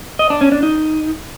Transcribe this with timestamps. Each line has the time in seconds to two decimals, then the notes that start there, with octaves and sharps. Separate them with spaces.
0.19 D#5
0.30 D4
0.41 C#4
0.52 D4
0.63 D#4